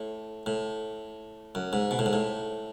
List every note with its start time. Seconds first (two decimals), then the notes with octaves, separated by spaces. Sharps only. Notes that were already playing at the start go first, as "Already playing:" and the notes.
Already playing: A2
0.46 A2
1.55 F#2
1.73 G#2
1.91 B2
1.99 A2
2.06 G#2
2.13 A2